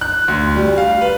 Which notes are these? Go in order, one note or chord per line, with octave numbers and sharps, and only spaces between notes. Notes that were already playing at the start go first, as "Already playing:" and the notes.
F#6
D2
G3
F5
B4